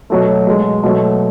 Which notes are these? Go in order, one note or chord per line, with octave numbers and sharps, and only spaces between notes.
B2 F#3 A3
B2 G#3
B2 F#3 A3